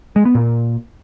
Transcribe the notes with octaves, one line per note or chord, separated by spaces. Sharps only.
G#3
B3
A#2